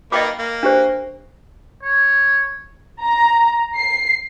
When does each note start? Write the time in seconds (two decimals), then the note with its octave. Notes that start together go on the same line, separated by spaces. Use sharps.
0.12 A#3 D#4 B4 D#5 G5 D6
0.39 A#3
0.63 D4 G4 C5
1.83 C#5
3.01 A#5
3.76 C7